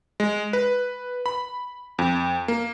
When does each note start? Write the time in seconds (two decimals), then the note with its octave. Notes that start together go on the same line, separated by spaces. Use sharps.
0.20 G#3
0.53 B4
1.26 B5
1.99 F2
2.48 A#3